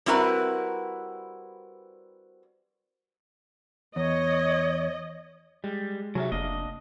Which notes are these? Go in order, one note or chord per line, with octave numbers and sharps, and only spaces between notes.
G3 C4 E4 F#4 A#4 B4
E2 C#5 D#5
G3 G#3
C3 F#3 G#4 C#5 E5
F1 A#3 D4 D#5